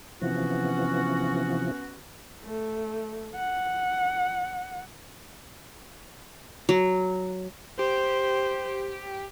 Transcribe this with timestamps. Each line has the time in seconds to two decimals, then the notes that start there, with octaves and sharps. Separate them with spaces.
0.21 C3 E3 F3 B3 C#4 F#4
2.44 A3
3.36 F#5
6.69 F#3
7.79 G4 C5